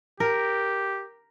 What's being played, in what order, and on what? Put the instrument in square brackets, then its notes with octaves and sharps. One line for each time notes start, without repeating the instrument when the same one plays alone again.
[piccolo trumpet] G4 [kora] A#4